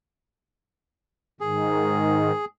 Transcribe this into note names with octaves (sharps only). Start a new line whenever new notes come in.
G#2 D#3 G#4